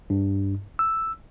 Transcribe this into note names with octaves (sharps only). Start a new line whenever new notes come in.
G2
E6